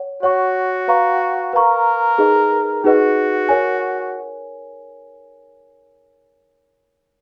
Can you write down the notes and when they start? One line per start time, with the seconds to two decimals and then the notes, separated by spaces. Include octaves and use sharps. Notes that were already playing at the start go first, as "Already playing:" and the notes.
Already playing: C#5 F#5
0.23 F#4 C#5 F#5 C#6
0.88 B4 F5 A#5 C#6
1.53 A#4 B4 F5 A#5 C#6
2.18 D#4 G#4 B4 D#5
2.83 D#4 F#4 G#4 B4 D#5
3.49 A#4 C#5 G#5